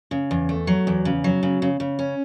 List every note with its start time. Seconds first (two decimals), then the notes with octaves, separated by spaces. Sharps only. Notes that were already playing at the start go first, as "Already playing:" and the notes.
0.11 C#3
0.31 E2
0.49 A3
0.67 F#3
0.87 E2
1.05 C#3
1.24 F#3
1.43 C#3
1.62 C#3
1.80 C#3
1.99 C#4